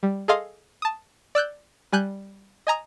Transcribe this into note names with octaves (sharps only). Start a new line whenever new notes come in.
G3
G#4 A4 D#5 F5 C6 D#6
A5 D#6
D5 E6 F#6 G6
G3 G#5 F#6 G6
D#5 G#5 A#5 D#6